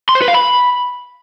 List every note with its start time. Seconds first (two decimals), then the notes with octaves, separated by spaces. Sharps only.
0.09 C6
0.15 C5
0.22 B4
0.28 F5
0.34 B5